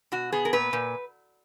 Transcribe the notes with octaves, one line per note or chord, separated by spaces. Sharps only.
B2 F#4
B3 G#4
A#4
A#2 B4
A#2